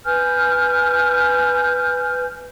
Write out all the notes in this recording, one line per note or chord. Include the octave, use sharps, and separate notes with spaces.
B4 G#5 F6 G6